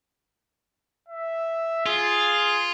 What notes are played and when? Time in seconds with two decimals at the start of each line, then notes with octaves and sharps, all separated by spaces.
1.09 E5
1.86 F4 G#4